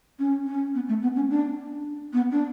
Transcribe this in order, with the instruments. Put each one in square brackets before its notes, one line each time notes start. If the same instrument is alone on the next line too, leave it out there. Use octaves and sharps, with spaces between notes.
[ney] C#4
C#4
B3
A3
B3
C#4
D4
B3
D4